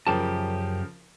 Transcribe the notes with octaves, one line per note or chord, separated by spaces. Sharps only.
F#2 C#3 F3 G4 A#4 A5